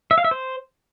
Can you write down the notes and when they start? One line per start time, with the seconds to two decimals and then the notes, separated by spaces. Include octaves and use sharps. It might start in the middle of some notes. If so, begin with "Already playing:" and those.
0.11 E5
0.18 F5
0.24 E5
0.31 C5